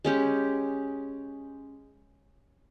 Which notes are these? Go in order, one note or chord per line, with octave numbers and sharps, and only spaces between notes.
G#3 C#4 G4